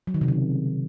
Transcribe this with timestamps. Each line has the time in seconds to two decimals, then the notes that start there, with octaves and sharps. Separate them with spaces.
0.07 F#3
0.14 D#3
0.21 C3
0.28 C#3